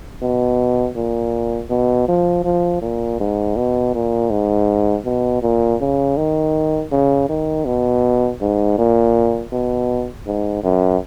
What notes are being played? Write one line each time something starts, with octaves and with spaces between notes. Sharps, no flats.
B2
A#2
B2
F3
F3
A#2
G#2
B2
A#2
G#2
B2
A#2
C#3
D#3
C#3
D#3
B2
G#2
A#2
B2
G#2
F#2